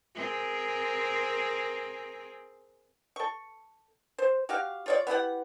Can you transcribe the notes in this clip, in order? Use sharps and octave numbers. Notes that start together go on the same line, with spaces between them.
C4 G#4 A#4
A4 C#6
C5
F#4 G4 F5
F4 C#5 D5
B3 E4 G4 F#5